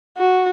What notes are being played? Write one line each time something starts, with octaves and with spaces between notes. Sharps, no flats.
F#4